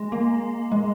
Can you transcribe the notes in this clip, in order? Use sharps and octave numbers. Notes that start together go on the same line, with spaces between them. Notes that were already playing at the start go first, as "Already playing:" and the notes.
Already playing: G#3
A#3
G#3